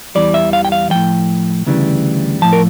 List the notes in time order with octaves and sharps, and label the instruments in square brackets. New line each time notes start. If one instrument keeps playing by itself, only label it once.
[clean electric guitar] E2 E3 G3 D5
E5
F5
G5
F5
A2 F3 G5
D2 C#3 E3 G3
A2 F3 A5
A#4